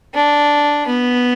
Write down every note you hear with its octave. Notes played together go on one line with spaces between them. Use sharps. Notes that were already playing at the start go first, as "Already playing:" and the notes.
D4
B3